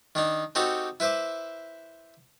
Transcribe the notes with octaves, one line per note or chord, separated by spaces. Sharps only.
D#3 D4 D#4
C4 D#4 F#4 G4 A4 C#5
E4 B4 C5 E5 D6